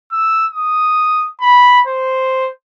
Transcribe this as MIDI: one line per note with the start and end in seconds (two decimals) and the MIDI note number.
0.12 0.46 88
0.53 1.28 87
1.41 1.80 83
1.87 2.50 72